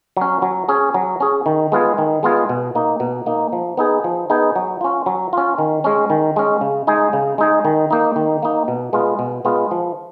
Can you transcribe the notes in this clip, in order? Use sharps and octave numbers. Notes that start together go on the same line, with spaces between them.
F#3 C#4
F#3
C#4 G#4
F#3
C#4 G#4
D#3
G#3 B3 F4 G#4
D#3
G#3 B3 F4 G#4
B2
A#3 D#4
B2
A#3 D#4
F3
B3 D#4 G#4
F3
B3 D#4 G#4
F#3
C#4 F4
F#3
C#4 F4
D#3
G#3 C#4
D#3
G#3 C#4
C#3
G#3 D#4 G#4
C#3
G#3 D#4 G#4
D#3
A#3 D#4
D#3
A#3 D#4
B2
G#3 B3 F4
B2
G#3 B3 F4
F3